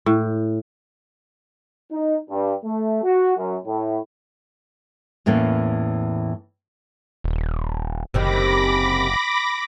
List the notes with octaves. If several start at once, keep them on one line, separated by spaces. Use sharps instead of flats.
A2
D#4
G2
A3
F#4
F#2
A2
E2 A2 E3 A#3 C#4
D#1
F#1 C3 D#3 C4 B5 D6 A#6